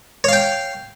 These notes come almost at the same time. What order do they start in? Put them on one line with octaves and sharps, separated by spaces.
C#5 F5 G5